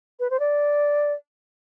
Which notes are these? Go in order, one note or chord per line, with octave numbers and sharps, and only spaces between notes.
B4
C5
D5